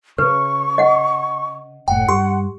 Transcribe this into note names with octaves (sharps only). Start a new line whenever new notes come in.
C#3 B4 C#6
D#5 F#5
F#1 A2 F#5 G5
G2 G4 C6